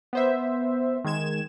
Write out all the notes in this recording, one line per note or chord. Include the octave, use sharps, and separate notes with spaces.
B3 C5 E5
D#3 G#3 G#6 E7